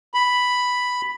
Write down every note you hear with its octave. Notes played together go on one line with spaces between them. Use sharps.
B5